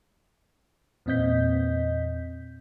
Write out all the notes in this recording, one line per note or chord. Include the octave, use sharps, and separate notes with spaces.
E2 A#2 C4 D#5 G6 B6